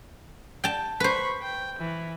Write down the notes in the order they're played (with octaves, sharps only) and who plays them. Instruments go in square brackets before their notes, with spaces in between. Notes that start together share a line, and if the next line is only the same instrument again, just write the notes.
[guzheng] G5 A5
[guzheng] B4 C5 [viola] B5 C#6
[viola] G5
E3